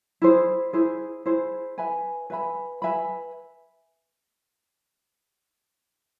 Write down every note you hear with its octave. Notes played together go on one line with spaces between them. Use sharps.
E4 G#4 C5
E4 G#4 C5
E4 G#4 C5
B4 E5 G#5 B5
B4 E5 G#5 B5
B4 E5 G#5 B5